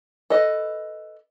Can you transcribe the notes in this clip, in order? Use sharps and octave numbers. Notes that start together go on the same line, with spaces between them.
A4 B4 D#5